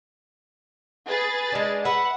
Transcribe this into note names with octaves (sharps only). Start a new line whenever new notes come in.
G#4 B4 A6
G#3 D4
B4 E5 F#5